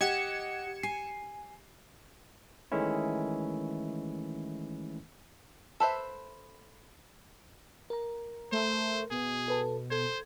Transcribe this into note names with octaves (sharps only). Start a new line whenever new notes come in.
G4 D#5 F#5 G#6 C#7 E7
G#5 C7
D#3 E3 G#3 A3 C#4 E4
A4 B4 C5 E5
A#4 A#5
A3 C5
B2 G#4
A4 B4 A5
A4 C5 G#6